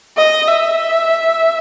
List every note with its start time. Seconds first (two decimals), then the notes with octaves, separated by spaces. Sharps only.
0.17 D#5
0.47 E5